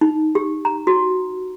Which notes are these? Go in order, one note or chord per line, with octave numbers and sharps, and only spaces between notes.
D#4
G4
A#5
F#4